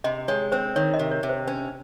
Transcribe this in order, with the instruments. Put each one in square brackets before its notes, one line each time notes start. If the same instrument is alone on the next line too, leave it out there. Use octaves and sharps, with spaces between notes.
[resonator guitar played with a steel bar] C3 [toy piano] D#5
[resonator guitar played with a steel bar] G#3 [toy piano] C#5
[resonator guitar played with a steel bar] C4 [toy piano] C5
[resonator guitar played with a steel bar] D#3 [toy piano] C#5
[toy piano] D#5
[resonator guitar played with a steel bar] C3
[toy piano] C#5
[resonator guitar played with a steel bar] C3
[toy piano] C5
[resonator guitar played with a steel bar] C#4 [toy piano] C5